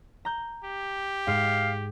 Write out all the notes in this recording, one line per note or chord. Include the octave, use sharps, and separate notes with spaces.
A#5 G6
G4
G#2 F5